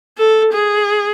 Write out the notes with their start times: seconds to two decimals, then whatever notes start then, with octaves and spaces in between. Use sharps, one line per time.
0.18 A4
0.53 G#4